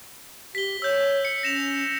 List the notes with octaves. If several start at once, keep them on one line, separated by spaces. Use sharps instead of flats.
G4 B6 G7
C#5 E6 G6
C#7
C#4 A#6 E7 F7